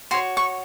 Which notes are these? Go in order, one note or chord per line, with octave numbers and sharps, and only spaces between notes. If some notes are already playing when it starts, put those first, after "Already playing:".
F#4 C#5 C6
C#6